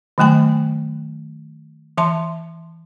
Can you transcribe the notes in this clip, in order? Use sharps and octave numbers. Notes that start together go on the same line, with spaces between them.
D#3 F#3 A3 G5 G#5
E3 E5 A5 C6